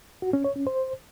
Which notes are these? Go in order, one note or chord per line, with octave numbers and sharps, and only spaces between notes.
F#4
C#4
C#5
C#4
C5